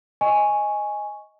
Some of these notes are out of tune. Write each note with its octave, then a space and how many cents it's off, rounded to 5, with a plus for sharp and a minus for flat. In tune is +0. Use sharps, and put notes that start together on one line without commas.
D#5 +0 G#5 +0 C#6 +0